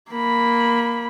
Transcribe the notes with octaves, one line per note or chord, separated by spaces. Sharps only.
A#3 B5